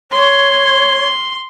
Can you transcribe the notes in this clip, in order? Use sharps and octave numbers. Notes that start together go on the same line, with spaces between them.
C#5 C6